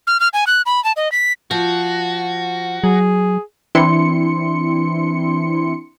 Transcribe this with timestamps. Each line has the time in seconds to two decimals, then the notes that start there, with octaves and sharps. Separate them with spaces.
0.07 F6
0.20 F6
0.33 G#5
0.47 F#6
0.66 B5
0.84 A5
0.97 D#5
1.12 B6
1.51 F3 F#4
2.84 F#3 G#4
3.75 E3 C4 D4 E4 C6 C#7